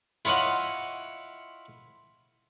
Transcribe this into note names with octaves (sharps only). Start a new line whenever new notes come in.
E4 F4 C#5 D#5 F#5